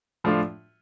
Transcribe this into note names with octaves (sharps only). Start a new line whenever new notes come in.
A2 F3 A3 D4 F4